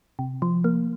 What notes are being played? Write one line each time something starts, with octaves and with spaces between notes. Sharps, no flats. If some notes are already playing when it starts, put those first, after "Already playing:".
C3
F3
A#3